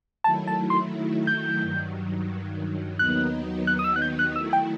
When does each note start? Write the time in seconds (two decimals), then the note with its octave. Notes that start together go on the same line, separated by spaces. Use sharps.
0.24 D#3 F#3 A3 E4 A5
0.47 A5
0.70 C6
1.27 G6
1.61 G2 D#3 F#3
2.99 D#2 D#3 F#3 B3 D#4 F#6
3.67 F#6
3.79 D#6
3.84 E6
3.96 F#6
4.02 G6
4.19 F#6
4.35 D#3 F#3 A3 E4 E6
4.53 G5